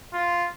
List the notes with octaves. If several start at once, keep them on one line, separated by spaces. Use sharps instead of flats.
F4